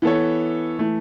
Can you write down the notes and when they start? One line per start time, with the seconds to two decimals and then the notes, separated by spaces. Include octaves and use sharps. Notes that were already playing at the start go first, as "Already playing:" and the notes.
0.02 E3 B3 A4 C#5
0.79 E3 A3